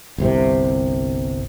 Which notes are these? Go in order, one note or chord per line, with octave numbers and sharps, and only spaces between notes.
G1 C2 C3